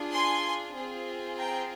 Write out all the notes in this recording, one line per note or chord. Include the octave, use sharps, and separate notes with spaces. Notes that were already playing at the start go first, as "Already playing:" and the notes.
Already playing: D4 F4 G#4
G#5 C6
C4 F4 G#4
G5 A#5